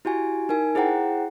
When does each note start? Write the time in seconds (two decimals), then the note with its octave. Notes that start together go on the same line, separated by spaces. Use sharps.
0.05 E4 F#4 G4 G#5
0.49 D#4 A#4 G#5
0.75 E4 G#4 C5 F#5 G5 A#5